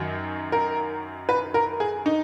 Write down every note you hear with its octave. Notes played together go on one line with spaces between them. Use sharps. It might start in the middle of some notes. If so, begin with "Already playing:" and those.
Already playing: F#2 D#3 F#3
A#4
B4
A#4
G#4
D#4